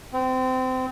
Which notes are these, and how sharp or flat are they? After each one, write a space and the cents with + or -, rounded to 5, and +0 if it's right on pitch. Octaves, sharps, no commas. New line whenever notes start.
C4 -25